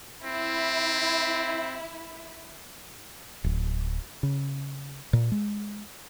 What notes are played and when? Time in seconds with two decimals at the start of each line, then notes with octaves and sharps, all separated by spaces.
0.24 C4 E4
3.44 D1
4.23 C#3
5.13 A#2
5.32 G#3